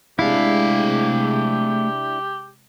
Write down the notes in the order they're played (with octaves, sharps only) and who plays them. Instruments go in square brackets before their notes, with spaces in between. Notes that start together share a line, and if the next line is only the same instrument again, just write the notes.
[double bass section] C3 G#3 [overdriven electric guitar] A3 F5 [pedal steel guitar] D4 E4 [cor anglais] G4